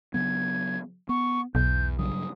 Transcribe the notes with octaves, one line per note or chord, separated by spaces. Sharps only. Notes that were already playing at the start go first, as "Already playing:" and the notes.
C#3 F#3 B3 G#6
B3 C#6
B1 E2 G6
G2 C#3 F#3 D#6